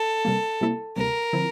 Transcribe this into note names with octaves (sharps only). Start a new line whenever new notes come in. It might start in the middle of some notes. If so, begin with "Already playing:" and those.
Already playing: A4
C3 G3 A#3
C3 G3 A#3 E4
D2 C3 G3 A#3 A#4
D3 F3 C4 E4